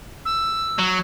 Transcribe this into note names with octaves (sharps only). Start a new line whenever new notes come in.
E6
F#3